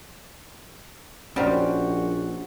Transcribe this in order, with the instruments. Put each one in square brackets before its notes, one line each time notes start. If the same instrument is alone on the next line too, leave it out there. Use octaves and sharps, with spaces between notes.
[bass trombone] A#1 [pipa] D#3 G3 [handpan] C#4 C5 [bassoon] F#4